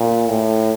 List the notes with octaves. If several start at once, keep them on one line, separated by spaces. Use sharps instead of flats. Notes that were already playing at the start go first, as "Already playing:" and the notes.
Already playing: A#2
A2